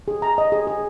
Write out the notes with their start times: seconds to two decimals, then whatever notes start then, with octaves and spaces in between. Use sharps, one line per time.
0.08 G#4
0.22 A#5
0.38 D#5
0.52 G#4
0.67 G#4